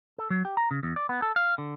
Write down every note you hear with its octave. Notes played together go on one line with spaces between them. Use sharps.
A4
F#3
G4
A#5
C#3
E2
D5
B3
A4
F5
D3